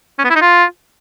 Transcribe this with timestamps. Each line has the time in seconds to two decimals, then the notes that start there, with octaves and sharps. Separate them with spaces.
0.19 C#4
0.24 B3
0.30 E4
0.36 D#4
0.42 F4